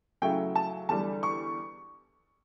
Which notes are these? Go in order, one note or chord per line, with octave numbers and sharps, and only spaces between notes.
C#3 F#3 A3 C#4 E4 G5
A5
E2 D3 G3 D4 A5
C#6